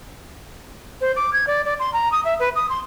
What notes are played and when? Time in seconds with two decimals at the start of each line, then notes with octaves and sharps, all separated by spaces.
1.01 C5
1.15 D6
1.33 G#6
1.47 D5
1.65 D5
1.79 C6
1.93 A#5
2.11 D#6
2.24 E5
2.39 B4
2.55 D#6
2.69 C6